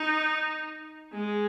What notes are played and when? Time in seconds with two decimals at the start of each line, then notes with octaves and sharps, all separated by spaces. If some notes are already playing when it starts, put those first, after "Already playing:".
Already playing: D#4
1.13 G#3